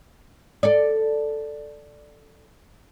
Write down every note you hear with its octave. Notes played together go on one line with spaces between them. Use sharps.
A4 D5